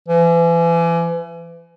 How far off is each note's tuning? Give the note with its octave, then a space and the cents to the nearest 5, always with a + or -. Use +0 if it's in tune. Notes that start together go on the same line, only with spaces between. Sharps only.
E3 +35